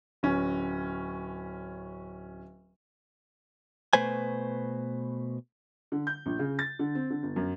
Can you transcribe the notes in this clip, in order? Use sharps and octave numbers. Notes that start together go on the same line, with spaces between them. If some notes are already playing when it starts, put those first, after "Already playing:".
D1 C#4
B2 A3 B4 C5 G#5
D3
G6
A#1
C#3
A6
D3
C4
D3
G1
F#2